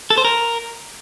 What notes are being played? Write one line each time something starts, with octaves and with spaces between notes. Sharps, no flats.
A4
C5
A#4